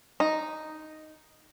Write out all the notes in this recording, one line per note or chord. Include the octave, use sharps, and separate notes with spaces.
D#4